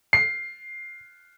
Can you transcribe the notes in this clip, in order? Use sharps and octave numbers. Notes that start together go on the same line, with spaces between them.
C7